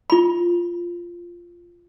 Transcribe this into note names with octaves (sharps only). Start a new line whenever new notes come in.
F4 B5